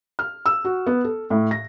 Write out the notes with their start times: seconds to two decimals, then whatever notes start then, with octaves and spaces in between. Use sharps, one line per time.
0.19 F6
0.46 E6
0.65 F#4
0.87 B3
1.04 A4
1.30 A2
1.51 A#6